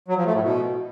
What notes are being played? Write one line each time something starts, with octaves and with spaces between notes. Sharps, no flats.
F#3
F3
A3
A2
B2